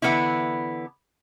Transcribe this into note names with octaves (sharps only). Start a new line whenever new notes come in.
D3 E3 B3 C#4 D4 E4